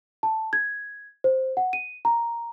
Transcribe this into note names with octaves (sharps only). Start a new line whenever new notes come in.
A5
G#6
C5
F#5
D#7
A#5